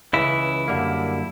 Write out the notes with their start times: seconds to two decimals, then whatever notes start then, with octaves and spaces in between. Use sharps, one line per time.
0.13 C#2 C#3 E3 E4
0.68 F#2 D3 G3 A#3